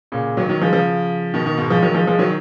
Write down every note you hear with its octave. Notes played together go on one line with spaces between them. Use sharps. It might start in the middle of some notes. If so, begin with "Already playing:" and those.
A#2 C#3
D#3 F#3
D#3 F#3
F3 G#3
C#3 F3
B2 D#3
B2 D#3
G#2 B2
F3 G#3
D#3 F#3
F3 G#3
F3 G#3
D#3 F#3